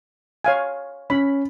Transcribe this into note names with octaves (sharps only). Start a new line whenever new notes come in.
C#5 F5 G#5
C#4 B5